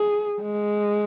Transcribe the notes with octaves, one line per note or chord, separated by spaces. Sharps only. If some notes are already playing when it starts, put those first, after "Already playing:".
Already playing: G#4
G#3